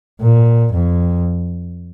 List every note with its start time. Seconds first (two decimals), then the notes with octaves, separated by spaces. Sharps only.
0.21 A#2
0.73 F2